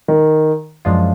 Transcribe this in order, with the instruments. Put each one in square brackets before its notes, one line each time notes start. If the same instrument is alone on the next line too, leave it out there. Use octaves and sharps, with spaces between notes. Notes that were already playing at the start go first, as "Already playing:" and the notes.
[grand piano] D#3
[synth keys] F#2 F3 G#3 D4 F4